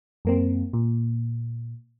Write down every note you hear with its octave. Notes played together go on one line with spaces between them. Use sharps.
F#2 A#3 C4
A#2